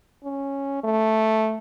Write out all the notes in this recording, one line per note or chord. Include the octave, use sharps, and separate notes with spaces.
C#4
A3